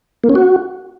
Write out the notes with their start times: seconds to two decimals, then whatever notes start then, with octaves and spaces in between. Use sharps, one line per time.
0.24 A#3
0.29 C#4
0.35 F#4